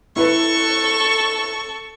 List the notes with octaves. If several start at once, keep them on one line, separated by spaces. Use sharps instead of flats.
E4 A4 B4 C#6